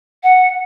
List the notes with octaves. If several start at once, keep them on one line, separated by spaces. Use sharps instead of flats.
F#5